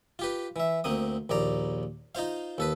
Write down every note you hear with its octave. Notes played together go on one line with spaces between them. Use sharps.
F4 G4 B4
E3 E5
D2 A#3 C4 D#6
A#1 D#2 D5 A#5
D#4 F4 C5 F5
D#2 A4 B4